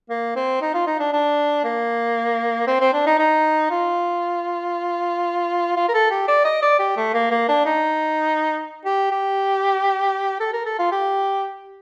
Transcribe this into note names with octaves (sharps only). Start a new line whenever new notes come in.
A#3
C4
D#4
F4
D#4
D4
D4
A#3
C4
C4
D4
D#4
D#4
F4
F4
A#4
A4
G4
D5
D#5
D5
G4
A3
A#3
A#3
D4
D#4
G4
G4
A4
A#4
A4
F4
G4